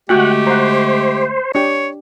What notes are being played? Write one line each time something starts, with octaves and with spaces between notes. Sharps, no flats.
D3 G#3 A3 F#4 G4 F#5 G5
C5 F#5 A#5
D4 G4 C#5